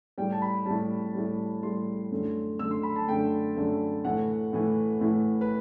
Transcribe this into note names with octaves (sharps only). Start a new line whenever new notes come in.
A2 G3 G5
A5
B5
A2 G3 A5
A2 G3
A2 G3 C6
F#2 D3 A3
F#2 D3 A3 E6
C6
B5
A5
F#2 D3 A3 G5
F#2 D3 A3
A2 E3 A3 F#5
A2 E3 A3
A2 E3 A3
B4